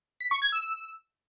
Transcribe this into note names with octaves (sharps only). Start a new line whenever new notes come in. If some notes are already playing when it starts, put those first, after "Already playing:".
B6
C#6
G#6
E6